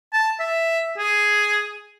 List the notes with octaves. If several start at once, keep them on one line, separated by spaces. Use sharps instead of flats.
A5
E5
G#4